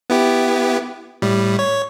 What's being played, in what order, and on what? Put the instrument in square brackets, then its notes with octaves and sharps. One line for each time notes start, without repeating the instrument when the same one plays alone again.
[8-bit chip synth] B3 E4 G4
A2 G3
C#5